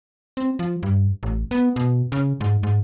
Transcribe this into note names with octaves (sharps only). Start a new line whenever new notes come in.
C4
F3
G2
A1
B3
B2
C#3
G#2
G#2